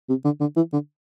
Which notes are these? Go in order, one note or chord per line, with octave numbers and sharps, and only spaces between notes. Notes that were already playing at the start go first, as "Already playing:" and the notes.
C3
D3
D3
E3
D3